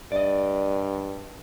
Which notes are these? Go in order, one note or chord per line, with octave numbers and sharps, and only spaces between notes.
G2 D5 D#5